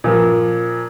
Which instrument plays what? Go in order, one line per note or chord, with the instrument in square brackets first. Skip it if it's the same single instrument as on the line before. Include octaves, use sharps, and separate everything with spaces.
[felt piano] A#2 F3